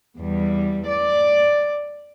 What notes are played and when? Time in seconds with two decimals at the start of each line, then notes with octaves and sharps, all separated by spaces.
0.17 E2 G3
0.87 D5